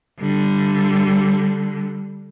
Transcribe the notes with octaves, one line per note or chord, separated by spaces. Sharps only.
D3 G3